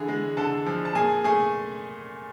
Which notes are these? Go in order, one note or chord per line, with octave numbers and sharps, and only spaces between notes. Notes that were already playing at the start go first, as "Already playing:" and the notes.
Already playing: D3 E3 G#4 G#5
G#3
D3 A4 A5
F3
A5
A#2 G#4 G#5
A3 G#4 G#5